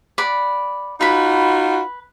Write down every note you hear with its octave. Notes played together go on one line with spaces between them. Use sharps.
D5 F#5 B5
D#4 F4 F#4 B4 B5